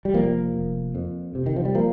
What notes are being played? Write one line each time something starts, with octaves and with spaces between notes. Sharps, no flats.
G3
F1 F3 A#3
F1
F2
C3
D#3
F3
G3
F3 A#3